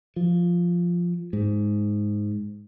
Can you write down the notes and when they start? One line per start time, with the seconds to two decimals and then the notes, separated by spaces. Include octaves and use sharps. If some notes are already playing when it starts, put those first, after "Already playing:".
0.16 F3
1.33 G#2